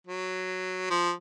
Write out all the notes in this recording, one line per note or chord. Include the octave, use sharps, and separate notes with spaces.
F#3
F3